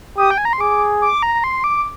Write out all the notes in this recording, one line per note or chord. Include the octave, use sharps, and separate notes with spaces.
G4 D#6
G5
G#5
A#5
C6
G#4 D6
D6
A#5
C6
D6